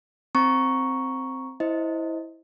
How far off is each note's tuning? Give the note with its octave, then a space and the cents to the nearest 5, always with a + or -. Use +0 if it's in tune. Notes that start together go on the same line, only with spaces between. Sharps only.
C4 +0 A#5 +10 C#6 +0
E4 -10 C5 +0 D#5 +15